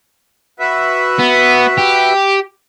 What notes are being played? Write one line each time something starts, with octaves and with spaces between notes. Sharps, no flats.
F#4 B4 E5
B3
G4